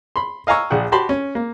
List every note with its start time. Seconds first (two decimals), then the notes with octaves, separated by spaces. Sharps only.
0.16 B5 C6
0.47 D#5 F5 G#5 A#5 C#6 E6
0.70 A#1 D4 G#4 F#5 G5
0.92 F#4 G4 A5 B5 C6
1.09 C#4
1.35 A#3